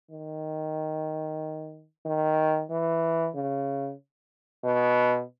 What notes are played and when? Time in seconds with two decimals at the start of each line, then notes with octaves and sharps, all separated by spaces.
0.11 D#3
2.06 D#3
2.70 E3
3.35 C#3
4.64 B2